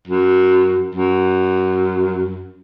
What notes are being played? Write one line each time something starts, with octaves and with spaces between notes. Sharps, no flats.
F#2
F#2